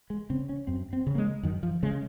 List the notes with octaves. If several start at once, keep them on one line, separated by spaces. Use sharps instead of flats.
G#3
C#3 C4
C#4
F#2 C4
C4
C#3
A#3
G#3
F#2 D#3
F3
C#3 G#3